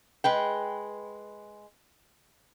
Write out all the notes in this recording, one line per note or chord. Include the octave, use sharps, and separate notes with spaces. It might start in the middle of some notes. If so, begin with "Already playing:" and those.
G#3 B4 G5